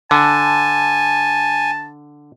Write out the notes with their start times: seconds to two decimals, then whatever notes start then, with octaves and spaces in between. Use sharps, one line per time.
0.11 D3 G#5 A5